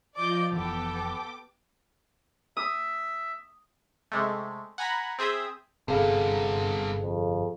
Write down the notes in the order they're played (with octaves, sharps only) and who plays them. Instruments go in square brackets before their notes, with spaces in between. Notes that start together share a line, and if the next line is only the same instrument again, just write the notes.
[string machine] F3 F4 [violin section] D5 D#5 G6 [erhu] D6
[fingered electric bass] F1 E3 F3 [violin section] B3 G4 G5 [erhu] A4 [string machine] D6
[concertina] E5 [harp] D#6
[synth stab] C3 G#3 A3
F#5 G#5 A#5 B5
C4 G#4 E5 D#6 G6
[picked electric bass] G1 C3 [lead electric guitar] G2 B3 [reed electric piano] G#4 A4 F5
[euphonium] F2